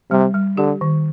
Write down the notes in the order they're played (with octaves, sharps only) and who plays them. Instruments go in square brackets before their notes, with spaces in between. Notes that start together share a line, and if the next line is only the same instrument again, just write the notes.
[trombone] C3 [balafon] G3
[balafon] G3
[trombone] D3 [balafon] G4
[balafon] D#3